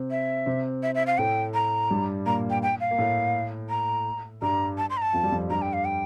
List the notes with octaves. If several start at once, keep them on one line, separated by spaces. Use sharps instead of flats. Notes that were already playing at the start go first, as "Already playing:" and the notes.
Already playing: C3 C4
E5
C3 C4
E5
E5
F5
A2 A3 G5
A#5
G2 G3
A#2 A#3 A#5
G5
G5
F5
A#3
A2 A3
A#5
G2 G3 A#5
A5
C6
A#5
A5
F2 F3
G3
F2 F3
G2 G3 A#5
G5
F5
G5